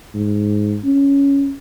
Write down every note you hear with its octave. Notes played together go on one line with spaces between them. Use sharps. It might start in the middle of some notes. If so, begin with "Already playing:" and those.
G#2
C#4